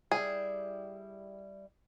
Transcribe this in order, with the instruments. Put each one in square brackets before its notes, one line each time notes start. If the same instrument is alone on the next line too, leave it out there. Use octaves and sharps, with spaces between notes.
[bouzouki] G3 E4 [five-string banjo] G#4